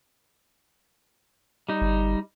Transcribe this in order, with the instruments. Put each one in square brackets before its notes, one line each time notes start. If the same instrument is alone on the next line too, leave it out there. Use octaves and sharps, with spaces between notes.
[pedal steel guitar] G3 D#4
[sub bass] G1